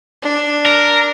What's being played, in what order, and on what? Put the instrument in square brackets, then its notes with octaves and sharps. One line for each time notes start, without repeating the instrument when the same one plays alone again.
[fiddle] D4
[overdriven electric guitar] A#4